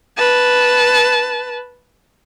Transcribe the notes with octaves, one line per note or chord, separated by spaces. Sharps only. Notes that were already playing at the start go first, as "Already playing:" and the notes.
B4 A5